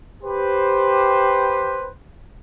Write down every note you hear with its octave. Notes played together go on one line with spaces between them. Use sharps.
G4 B4 C5